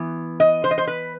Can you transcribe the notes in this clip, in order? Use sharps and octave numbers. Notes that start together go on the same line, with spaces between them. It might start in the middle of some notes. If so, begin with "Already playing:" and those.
Already playing: E3 B3
D#5
C5
D#5
C5
B4